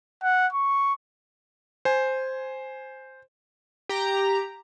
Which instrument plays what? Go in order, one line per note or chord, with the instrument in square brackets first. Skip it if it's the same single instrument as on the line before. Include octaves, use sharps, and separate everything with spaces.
[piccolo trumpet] F#5
C#6
[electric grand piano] C5 G#5
[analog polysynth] G4 A#5